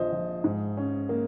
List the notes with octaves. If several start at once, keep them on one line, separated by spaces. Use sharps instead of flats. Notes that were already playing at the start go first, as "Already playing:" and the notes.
Already playing: A#1 F3 C5 D#5
F3
G#2
C#4
A#3